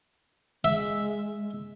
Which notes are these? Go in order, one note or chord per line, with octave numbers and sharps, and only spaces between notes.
G#3 E5